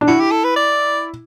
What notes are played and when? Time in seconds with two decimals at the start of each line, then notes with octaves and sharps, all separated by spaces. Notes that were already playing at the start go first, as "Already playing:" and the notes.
0.01 D4
0.07 E4 F#4
0.20 G4
0.31 A4
0.44 B4
0.56 D5